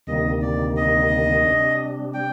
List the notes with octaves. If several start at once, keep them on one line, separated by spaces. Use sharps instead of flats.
D2 C3 D#3 G3 A#3 D#5
D5
D#5
C3 G3 D4
G5